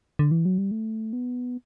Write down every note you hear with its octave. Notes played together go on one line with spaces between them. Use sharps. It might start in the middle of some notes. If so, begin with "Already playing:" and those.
D3
E3
F#3
G3
A3
B3